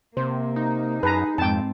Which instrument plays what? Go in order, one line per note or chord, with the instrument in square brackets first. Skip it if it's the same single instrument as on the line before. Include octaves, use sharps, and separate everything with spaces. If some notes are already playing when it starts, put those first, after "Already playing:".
[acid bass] C3 [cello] A#3 [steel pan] C5
[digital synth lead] D#4
[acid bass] F#2 [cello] G#4 [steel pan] B4 A5 A#5
[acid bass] F2 [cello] G#2 C4 [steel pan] G5 A5